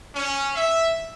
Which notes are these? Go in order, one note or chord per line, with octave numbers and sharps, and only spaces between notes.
C#4
E5